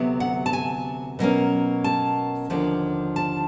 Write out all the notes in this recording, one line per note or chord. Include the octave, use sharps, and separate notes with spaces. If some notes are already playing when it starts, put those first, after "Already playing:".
Already playing: D2 C3 F#3 B3
F#5
A5
G#5
B2 F#3 A#3 C#4
A5
D#2 D3 F3
A5